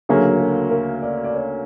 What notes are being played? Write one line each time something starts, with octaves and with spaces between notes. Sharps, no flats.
D2 C#3 F#3 A#3 C#4 G#4
A4
A#4
D5
D5
C#5